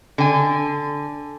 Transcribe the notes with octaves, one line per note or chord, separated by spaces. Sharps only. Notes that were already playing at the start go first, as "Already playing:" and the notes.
D3 G#5